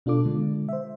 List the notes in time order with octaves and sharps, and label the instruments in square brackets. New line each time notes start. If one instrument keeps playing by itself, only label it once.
[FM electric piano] B2 D4 F4 A4 D6
D3 G#3
C5 E5